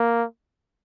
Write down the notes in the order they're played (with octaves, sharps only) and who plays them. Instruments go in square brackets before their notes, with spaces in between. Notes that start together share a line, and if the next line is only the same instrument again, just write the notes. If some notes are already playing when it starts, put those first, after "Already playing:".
Already playing: [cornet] A#3